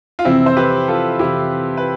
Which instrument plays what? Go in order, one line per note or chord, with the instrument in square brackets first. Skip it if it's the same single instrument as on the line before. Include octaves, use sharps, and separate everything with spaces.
[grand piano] F4
[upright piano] F2 C3 E3 [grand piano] C4 E4
[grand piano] C5
G4 B4
F4 A4
[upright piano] F2 C3 E3 [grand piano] E4 G4
[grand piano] B4